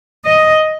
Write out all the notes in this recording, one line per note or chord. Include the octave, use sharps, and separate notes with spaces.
D#5